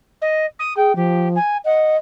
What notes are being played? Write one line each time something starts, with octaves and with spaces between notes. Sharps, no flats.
D#5
D#6
G#4 G5
F3 G4
G#5
D#5 F#5